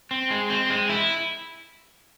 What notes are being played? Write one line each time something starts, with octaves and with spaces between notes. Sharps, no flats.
C4
G#3
C4
G#3
E4